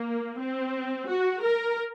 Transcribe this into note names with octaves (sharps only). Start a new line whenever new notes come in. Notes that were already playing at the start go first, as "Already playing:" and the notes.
Already playing: A#3
C4
F#4
A#4